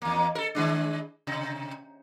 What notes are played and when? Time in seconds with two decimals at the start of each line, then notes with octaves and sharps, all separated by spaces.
0.02 E2 A#3
0.35 A4 A#4
0.55 D#3 G#3 D4
1.27 C3